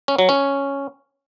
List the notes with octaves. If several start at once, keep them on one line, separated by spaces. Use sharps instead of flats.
C#4
F#3
C#4